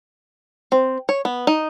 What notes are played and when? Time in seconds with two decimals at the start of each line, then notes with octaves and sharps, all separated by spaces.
0.72 C4
1.09 C#5
1.25 B3
1.47 D#4